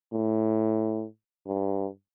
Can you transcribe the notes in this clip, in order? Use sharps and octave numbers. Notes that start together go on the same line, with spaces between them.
A2
G2